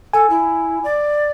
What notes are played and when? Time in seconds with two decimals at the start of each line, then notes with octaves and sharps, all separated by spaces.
0.13 A4 G#5
0.30 E4
0.84 D5